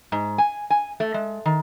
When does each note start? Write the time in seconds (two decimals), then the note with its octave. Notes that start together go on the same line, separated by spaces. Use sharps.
0.12 G#2
0.38 G#5
0.70 G#5
1.00 A3
1.14 G#3
1.45 D#3